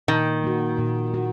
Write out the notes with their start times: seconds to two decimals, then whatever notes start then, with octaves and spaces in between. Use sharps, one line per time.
0.08 A#2 D#3
0.44 A#3 F#4
0.79 A#2
1.14 F#4